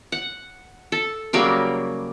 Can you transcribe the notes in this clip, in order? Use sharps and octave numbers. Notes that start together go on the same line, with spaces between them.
F#5
A4
C#3 F#3 G3 A#3